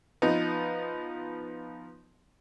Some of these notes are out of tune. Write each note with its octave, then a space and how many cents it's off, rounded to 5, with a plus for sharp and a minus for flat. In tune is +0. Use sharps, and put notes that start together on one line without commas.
F3 +0 B3 +0 D#4 +0